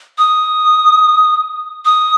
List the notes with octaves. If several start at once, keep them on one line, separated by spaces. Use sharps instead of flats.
D#6
D#6